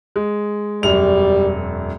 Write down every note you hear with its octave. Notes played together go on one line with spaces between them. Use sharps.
G#3
E1 F#2 G3 F7